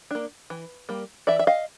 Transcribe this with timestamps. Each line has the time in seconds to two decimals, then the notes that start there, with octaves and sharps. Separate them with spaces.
0.11 A#3 D4
0.50 E3
0.89 G3 A#3
1.27 E3 D5 E5
1.39 E5
1.47 D#5 F5